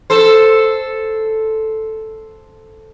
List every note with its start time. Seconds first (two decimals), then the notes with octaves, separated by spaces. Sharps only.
0.10 A4 C5